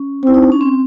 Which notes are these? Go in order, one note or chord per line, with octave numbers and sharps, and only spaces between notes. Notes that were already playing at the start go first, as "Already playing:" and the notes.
Already playing: C#4
C4 E4
D#4
D4
C#4
C4